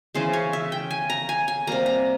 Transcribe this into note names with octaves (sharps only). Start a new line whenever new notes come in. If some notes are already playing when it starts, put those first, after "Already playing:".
C#3 E3 G#3 C5
C#5
E5
G5
G#5
A#5
G#5
G#5
C3 G3 A#3 A#5
A#5